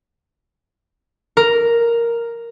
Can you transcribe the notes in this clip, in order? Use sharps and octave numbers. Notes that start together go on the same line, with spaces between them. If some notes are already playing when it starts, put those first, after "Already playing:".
A#4